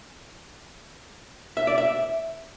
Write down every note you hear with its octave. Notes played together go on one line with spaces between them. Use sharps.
E5
D5
E5